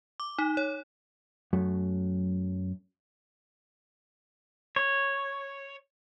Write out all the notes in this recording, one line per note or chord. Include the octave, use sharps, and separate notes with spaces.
D6
D#4
C#5
F#2 F#3 A3
C#5